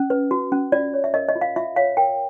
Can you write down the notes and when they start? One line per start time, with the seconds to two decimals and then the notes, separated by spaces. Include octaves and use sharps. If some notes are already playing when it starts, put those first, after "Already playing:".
Already playing: C#4
0.10 B4
0.31 F#4
0.52 C#4
0.72 F4 D5
0.94 C#5
1.04 E5
1.14 A#4 D#5
1.28 D#5
1.36 F4
1.41 F5
1.56 F4 E5
1.76 C#5 F5
1.97 A#4 G5